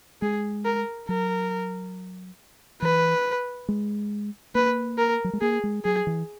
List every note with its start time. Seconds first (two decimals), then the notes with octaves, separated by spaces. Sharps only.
0.22 G#3 G#4
0.65 A#4
1.09 F#3 A#4
2.82 E3 B4
3.68 G#3
4.55 A#3 B4
4.98 A#4
5.24 F#3
5.33 G#3
5.41 A#3 G#4
5.64 G#3
5.84 F#3 G#4
6.07 E3